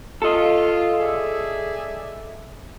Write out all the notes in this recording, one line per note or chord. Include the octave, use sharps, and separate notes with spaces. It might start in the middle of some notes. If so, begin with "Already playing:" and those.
F4 A4 D#5
G#4 D5 E5